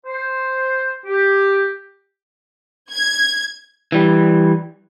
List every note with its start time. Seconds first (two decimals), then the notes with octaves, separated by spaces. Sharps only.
0.06 C5
1.05 G4
2.91 G#6
3.92 E3 G3